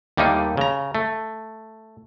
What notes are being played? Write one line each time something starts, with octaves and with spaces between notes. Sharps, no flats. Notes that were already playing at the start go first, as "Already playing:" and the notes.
D#2 G3 A3 A#3 D#4
C#3 A#5
A3